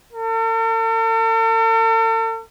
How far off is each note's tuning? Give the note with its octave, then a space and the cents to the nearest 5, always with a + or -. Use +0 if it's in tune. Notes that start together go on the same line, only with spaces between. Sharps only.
A4 +45